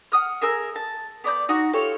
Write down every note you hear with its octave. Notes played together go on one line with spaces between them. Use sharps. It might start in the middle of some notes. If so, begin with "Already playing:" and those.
F#5 D#6 F6
G#4 A#4 E5 E6
A5
B3 D5 A#5 G6
D#4 F#4 F#5
F4 G4 A4 C#5